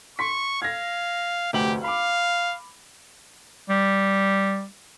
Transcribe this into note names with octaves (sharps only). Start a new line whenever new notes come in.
C6 C#6 B6
F5 G#6 A#6
F1 D2 G4 F#7
F5 B5 D6
G3